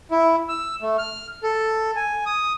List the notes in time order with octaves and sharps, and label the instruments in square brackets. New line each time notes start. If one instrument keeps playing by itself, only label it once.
[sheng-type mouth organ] E4
E6
A3
F6
A4
G#5
D#6